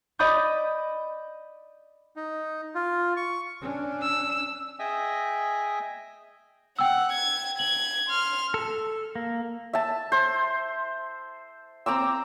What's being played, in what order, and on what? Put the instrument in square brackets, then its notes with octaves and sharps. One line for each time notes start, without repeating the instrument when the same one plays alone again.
[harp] D5 D#5 B5 D#6 G6
[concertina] D#4
F4
C#6
[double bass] C#4 D4
[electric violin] E6
[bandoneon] G#4 D#5 E5 G5 G#5 D#6
[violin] F#5 [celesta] G5 E6
[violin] G#6
[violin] G#6 [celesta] F#7
[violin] C6 F6
[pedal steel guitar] A4
A#3
[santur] E5 A5
C5
C4 A#5 D6 E6